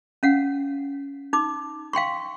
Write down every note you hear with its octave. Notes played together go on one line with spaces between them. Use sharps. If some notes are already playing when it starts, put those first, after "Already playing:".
C#4 F5 F#5
D#4 D6
F5 G5 C6 C#6